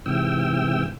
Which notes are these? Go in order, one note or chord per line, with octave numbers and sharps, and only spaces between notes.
G#2 C3 E3 G5 E6